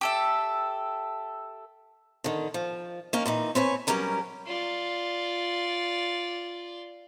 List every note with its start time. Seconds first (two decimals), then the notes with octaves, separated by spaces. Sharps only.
0.01 G4 A4 E5
2.24 D3 D#3
2.54 F3
3.13 A#3 C#4 D#4
3.26 A#2 E3 D#4
3.55 C4 B4 C#5 G#5
3.87 F#3 G3 C#4 A#4 B4
4.46 F4 D5